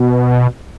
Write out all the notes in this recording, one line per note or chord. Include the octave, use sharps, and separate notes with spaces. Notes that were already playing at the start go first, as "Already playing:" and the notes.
Already playing: B2